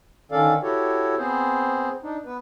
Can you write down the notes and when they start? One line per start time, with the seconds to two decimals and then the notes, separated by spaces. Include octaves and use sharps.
0.32 D3 D#3 C#4 A4 D5 F5
0.63 E4 F#4 G4 A4 C#5
1.18 B3 C4 G#4 C5
2.03 D4 D#4
2.25 B3 B4